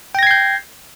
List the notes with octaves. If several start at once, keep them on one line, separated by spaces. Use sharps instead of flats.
G5 G6 G#6 A#6 C7